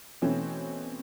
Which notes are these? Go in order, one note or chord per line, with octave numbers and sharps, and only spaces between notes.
B2 E3 A3 C4 C#4